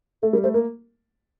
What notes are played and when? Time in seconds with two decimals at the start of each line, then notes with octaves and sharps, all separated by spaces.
0.22 A3 A4
0.33 G3 A#4
0.43 A3 C5
0.54 A#3 A#4